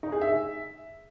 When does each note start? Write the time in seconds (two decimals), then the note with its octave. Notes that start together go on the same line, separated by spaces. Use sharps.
0.03 D#4
0.12 G#4
0.21 E5